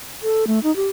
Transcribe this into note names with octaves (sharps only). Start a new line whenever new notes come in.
A4
A3
D#4
G4